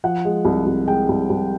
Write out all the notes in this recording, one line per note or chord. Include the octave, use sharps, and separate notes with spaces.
F3 F#5
G#3
C2
C2
G#3 G5
C2
C2